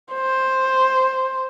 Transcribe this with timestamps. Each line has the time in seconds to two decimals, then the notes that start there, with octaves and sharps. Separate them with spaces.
0.13 C5